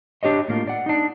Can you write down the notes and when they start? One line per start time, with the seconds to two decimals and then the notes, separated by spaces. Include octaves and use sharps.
0.23 D4 G4 C#5 D#5
0.48 A2 A#3 F4
0.67 D5 F#5
0.86 D4 D#4